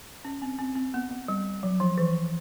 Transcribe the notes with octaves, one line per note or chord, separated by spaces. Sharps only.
C#4
C4
C4
C4
B3
B3
G3
F#3
F3
E3